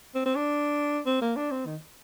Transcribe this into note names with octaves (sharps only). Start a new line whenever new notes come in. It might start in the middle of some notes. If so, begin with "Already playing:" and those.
C4
C4
D4
C4
A#3
D4
C4
D#3